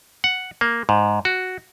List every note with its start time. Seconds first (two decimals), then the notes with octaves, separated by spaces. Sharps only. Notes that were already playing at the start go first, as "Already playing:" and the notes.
0.24 F#5
0.61 A#3
0.89 G#2
1.25 F#4